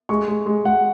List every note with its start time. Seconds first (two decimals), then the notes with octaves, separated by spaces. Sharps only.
0.09 G#3 C#6
0.28 G#3
0.46 G#3
0.65 G#3 F#5